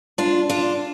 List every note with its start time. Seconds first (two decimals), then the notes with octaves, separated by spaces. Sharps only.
0.18 D4 F4
0.49 D4 F4